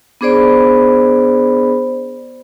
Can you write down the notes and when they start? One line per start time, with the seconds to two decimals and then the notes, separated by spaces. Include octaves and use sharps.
0.21 B3 D4 G#4 C5 D5 B5